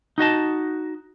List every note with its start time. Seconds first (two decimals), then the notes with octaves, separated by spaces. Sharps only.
0.18 D#4 F#4 D#5 A5